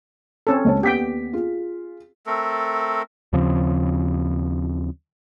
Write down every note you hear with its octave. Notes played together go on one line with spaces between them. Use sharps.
C4 C#4 A4
C#2 C#5 A5
D#2 B3 G4 G5 B6
F4 G#4
A3 C4 A4 A#4
D#2 C#3 F3 C4